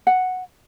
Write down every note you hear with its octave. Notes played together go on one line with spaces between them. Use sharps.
F#5